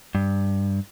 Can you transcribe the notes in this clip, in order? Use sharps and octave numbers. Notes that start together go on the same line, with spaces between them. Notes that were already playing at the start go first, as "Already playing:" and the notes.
G2